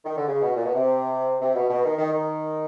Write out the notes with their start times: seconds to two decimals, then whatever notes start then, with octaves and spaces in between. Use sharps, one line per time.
0.05 D#3
0.17 D3
0.27 C#3
0.42 B2
0.56 A#2
0.66 B2
0.75 C3
1.42 C3
1.56 B2
1.70 B2
1.85 D#3
1.99 D#3
2.13 D#3